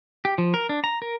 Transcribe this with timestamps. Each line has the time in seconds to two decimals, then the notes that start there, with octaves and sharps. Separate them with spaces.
0.25 G4
0.38 F3
0.54 A#4
0.69 D4
0.84 A#5
1.02 A#4